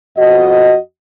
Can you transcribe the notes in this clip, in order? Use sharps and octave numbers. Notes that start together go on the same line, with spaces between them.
F2 F#4 D#5